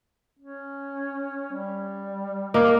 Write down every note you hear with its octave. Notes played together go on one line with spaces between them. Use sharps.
C#4
G3
A#3 A#4 D#5 D6